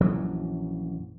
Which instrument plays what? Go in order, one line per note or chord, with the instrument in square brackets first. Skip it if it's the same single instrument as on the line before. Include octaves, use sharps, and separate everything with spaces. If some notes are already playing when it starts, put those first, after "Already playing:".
[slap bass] A#1 F#2 E3 F#3